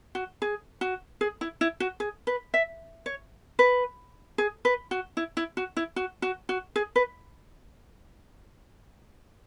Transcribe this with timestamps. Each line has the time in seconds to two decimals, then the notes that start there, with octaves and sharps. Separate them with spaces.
0.15 F#4
0.42 G#4
0.81 F#4
1.21 G#4
1.41 E4
1.61 E4
1.80 F#4
2.00 G#4
2.27 B4
2.54 E5
3.06 C#5
3.59 B4
4.38 G#4
4.65 B4
4.91 F#4
5.17 E4
5.37 E4
5.57 F#4
5.77 E4
5.96 F#4
6.22 F#4
6.49 F#4
6.76 G#4
6.96 B4